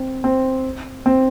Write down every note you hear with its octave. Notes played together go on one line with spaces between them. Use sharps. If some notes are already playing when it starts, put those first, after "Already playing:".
Already playing: C4
C4
C4